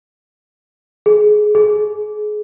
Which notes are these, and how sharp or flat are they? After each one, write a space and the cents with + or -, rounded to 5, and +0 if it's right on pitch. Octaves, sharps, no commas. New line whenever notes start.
G#4 +25
G#4 +30